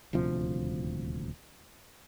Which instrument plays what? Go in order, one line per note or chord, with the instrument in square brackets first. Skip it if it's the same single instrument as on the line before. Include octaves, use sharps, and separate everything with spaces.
[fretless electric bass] D#1 D2 C3 F3